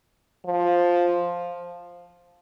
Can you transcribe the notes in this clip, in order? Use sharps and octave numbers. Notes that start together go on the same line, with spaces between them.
F3